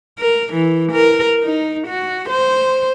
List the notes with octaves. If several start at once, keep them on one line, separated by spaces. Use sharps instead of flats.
A#4
E3
A#4
D#4
F#4
C5